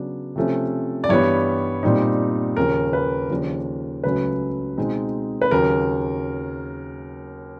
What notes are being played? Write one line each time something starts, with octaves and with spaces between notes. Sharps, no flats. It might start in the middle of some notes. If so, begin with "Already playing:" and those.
Already playing: C#3 F#3 B3 D4
C3 F3 A3 C#4
D5
G2 E3 G3 B3 C#5
A#2 G3 C4 D#4
D#2 C#3 F3 A#4
B4
D#2 C#3 F3 A#3 D4
C#2 C#3 F#3 A3 C#4 B4
B2 G#3 C4 D#4
B4
D#2 C#3 F#3 A#4